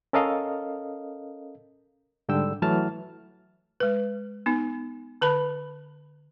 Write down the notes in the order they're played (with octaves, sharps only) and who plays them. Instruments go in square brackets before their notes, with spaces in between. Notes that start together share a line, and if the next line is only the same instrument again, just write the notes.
[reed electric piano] C#4 A4 A#4 D#5 F5
G#2 D3 G3 G5 E6
E3 F#3 A3 A5 F6
[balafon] G#3 B4
B3 D#4
D3 B4 A5 B5